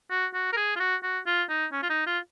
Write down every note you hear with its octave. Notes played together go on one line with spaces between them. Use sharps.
F#4
F#4
A#4
G#4
F4
F#4
F#4
F4
D#4
C#4
F4
D#4
F4